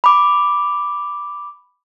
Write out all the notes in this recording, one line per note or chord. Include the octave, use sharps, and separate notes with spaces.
B5 D6